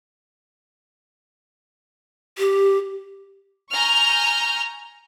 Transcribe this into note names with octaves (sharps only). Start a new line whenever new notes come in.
G4
G#5 A#5 C#6 F6 G6